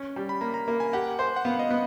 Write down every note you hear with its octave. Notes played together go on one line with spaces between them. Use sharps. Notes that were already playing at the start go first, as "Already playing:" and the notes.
Already playing: C#4
G3
B5
A#3 A#5
A#5
A#3
G#5
G4 F#5
C5
F#5
B3 F5
D#5
B3